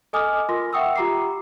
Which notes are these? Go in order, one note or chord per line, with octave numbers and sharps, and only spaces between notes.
A4 D#5 G#5 D6 D#6 F6
F4 A#4 C6 A#6
E5 F#5 G5 C#6 D#6 E6
F4 G4 A#5 D6 C7